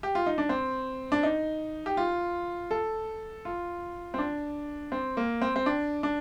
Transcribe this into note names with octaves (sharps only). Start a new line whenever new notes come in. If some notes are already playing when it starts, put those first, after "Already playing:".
G4
F4
D#4
D4
C4
D4
D#4
G4
F4
A4
F4
C4
D4
C4
A#3
C4
C4
D4
D4